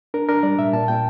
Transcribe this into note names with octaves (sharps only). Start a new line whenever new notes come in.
D4 A#4
D4 A#4
G3 D5
A#2 E5
A#2 A5
A#2 G5